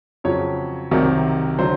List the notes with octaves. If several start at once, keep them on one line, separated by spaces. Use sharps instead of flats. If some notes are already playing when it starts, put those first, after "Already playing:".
F2 C#3 F#3 C#5
C2 C3 D#3 F#3
D3 F#3 C5